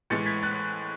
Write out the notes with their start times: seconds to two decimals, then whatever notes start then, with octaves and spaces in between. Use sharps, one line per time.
0.10 A2 E3 G#3 A6 C#7
0.26 G#6 B6
0.43 F#6 A6